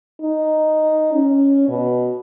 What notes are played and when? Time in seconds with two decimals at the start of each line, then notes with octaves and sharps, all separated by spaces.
0.21 D#4
1.13 C#4
1.69 B2